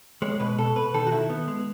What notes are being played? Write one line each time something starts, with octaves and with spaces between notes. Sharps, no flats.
G#3 C#5
B2 B4
B2 A4
B2 B4
D#3 A4
F#4
D#3 E4
B3
G#3